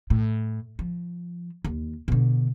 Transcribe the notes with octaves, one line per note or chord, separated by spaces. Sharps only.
A2
F3
D#2
B2 D3